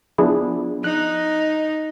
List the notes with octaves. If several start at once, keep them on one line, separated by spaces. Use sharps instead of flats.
F3 B3 D4 E4 G#4
D#4 F#6